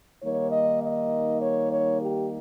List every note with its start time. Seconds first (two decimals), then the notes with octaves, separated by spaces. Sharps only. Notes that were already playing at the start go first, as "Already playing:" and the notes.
0.23 D#3 G3 A#3 D#4 C#5
0.52 D#5
0.83 D#5
1.42 C#5
1.72 C#5
2.02 G4